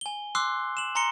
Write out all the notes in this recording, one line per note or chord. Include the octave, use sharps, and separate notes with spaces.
G#5 G7
C6 D6 E6 F#6 C7
E7 F#7
G#5 A#5 C6 A#6 C#7 G7